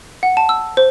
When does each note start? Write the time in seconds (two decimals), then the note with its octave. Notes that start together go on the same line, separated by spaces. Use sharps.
0.23 F#5
0.37 A5
0.49 E6
0.77 C5